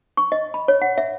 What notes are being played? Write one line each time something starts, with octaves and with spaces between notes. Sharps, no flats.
C#6
D#5
B5
C#5
F#5
E5